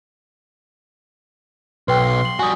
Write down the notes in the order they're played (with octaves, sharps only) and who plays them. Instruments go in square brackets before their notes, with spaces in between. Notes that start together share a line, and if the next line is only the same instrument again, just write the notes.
[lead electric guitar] B1 [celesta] B4 G5 E6 [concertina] C6
[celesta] F#7
[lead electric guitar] G3 F#4 [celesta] G#5 D#6